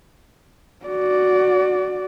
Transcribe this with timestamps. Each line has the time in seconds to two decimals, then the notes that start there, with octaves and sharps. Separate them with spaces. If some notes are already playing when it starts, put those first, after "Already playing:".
0.86 F#4 D5